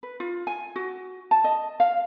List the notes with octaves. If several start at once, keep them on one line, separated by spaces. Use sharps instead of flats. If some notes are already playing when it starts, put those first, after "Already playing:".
B4
F4
G#5
F#4
A5
D#5
F5